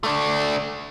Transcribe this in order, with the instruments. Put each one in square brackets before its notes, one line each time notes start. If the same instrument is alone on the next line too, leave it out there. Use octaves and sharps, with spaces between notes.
[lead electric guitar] A3 D4